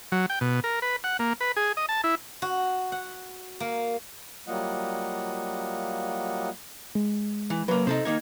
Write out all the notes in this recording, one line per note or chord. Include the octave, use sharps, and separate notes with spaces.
F#3
G5
B2
A#4
B4
F#5
A#3
B4
G#4
D#5
A5
E4
F#4
F#5
A#3
F#3 G3 A#3 F4 D#5 F#5
G#3
E3
F#3 A#3 B4
C3 D#4 A4 C5
D#3 A#3 D#4 G#6